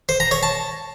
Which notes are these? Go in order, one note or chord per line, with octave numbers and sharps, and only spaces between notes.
C5
A#5
C#5
A5